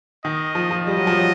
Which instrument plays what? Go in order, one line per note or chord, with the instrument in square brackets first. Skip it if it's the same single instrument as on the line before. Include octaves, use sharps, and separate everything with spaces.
[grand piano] D#3 [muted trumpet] D#5
[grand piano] F3
F3
[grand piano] G3 [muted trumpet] D#5
[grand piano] F#3
F3
F#3